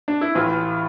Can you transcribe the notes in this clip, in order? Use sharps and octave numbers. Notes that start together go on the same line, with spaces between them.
D4
E4
A1 A2 E3 F4